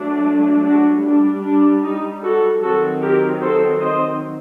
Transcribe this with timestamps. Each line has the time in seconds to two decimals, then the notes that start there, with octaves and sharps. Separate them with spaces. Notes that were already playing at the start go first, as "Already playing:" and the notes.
Already playing: F#3 A3 D4
0.65 D4 F#4
1.05 G3 D4
1.45 D4
1.84 D#4
2.23 F#4 A4
2.62 D#3 F#3 C4 F#4 A4
3.02 G4 A#4
3.42 A4 C5
3.80 C5 D#5